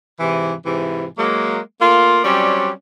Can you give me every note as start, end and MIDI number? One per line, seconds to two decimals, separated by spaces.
0.20 0.54 44
0.20 0.54 48
0.20 0.54 52
0.66 1.05 44
0.66 1.05 48
0.66 1.05 52
1.17 1.57 54
1.17 1.57 56
1.17 1.57 58
1.80 2.19 57
1.80 2.19 58
1.80 2.19 65
2.24 2.69 54
2.24 2.69 55
2.24 2.69 60
2.24 2.69 61
2.24 2.69 74